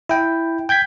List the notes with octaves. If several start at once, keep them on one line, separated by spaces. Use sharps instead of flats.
E4 G5
G5 G6 G#6 B6